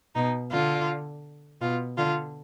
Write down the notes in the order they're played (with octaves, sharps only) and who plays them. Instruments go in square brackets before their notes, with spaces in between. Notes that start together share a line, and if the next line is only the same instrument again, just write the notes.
[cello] B2 [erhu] D#4
[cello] D3 [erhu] F4
[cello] B2 [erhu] F4
[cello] D3 [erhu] F4